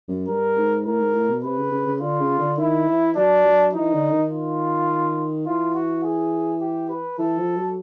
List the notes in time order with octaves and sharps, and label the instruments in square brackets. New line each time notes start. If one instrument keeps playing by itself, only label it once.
[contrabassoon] F#2
[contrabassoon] G2 [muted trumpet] A#4
[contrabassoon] G#2
[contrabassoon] A2 [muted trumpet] A#4
[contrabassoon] G#2
A2
B2
[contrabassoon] C3 [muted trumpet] B4
[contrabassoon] C#3
C#3
C#3
[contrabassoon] D3 [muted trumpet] F4
[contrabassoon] C#3
D3
[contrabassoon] D#3 [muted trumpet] E4
[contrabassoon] E3
[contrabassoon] F#3 [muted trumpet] D4
[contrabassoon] F#3
[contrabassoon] E3 [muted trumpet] D#4
[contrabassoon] D3
D#3
[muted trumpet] F4
[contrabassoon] E3 [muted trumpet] F4
[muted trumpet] F#4
G#4
G4
B4
[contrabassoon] E3 [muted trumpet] A4
[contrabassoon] F3
F#3